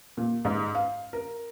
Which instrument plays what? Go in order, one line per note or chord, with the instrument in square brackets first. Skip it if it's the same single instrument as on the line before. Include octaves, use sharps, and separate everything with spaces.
[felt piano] A#2
G#2
F5
A#4